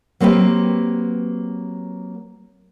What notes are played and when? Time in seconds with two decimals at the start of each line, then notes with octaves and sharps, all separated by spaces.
0.20 F#3 A#3 C4 G4 B4